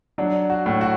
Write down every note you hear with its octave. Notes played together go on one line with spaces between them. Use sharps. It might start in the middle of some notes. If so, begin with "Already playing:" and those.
F#3 D4
F#4
A2
F#4